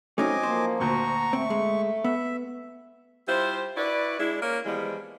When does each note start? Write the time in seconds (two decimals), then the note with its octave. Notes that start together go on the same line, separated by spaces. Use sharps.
0.18 F#3 A3 C4 C#4 D#4 D#5 G#5 D6
0.43 F3 A#3 C5
0.80 D2 A#2 F#4 A#5 C#6
1.33 A3 C4
1.50 G#3
2.04 B3 E5
3.28 G3 E4 F4 C5
3.77 E4 F#4 B4 D5
4.20 G#3 D4 E4
4.42 A#3 C#4 A#4
4.66 E3 F3 G3 G#3 B3